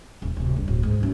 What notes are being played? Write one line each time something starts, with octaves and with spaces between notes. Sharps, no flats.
D#1
D1 C3
G2
D1
G#2
F#2 D#4